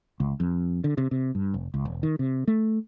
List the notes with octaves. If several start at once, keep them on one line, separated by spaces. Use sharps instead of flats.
C#2
F2
D3
C3
C3
G2
F1
C#2
E1
D#3
C3
A3